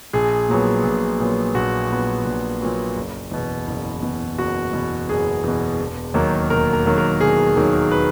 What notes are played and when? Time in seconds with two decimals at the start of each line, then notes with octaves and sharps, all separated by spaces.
0.13 A#1 G#4
0.49 A#2 F#3 B3
0.83 A#1
1.20 A#2 F#3 B3
1.54 A#1 F#4
1.90 A#2 F#3 B3
2.25 A#1
2.61 A#2 F#3 B3
2.96 F#1
3.31 E2 B2
3.67 F#1
4.02 E2 B2
4.38 F#1 F#4
4.73 E2 B2
5.09 F#1 G#4
5.44 E2 B2
5.80 E1
6.14 D#2 D#3 F#3 A#3
6.50 E1 A#4
6.73 A#4
6.86 D#2 D#3 F#3 A#3
6.98 A#4
7.20 E1 G#4
7.56 D#2 D#3 F#3 A#3
7.91 B4